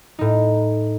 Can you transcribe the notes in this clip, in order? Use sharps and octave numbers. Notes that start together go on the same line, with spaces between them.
A2 D#4